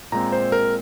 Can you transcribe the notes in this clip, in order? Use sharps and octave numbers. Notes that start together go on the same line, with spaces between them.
A#2 G#3 C4 A#5
C5
A#4